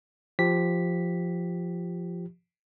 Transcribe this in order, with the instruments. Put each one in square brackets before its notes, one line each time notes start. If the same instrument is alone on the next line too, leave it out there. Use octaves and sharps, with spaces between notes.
[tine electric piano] F3 G4 B6